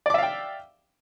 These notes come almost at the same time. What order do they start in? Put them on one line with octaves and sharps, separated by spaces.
D5 D6 E5 F5 G5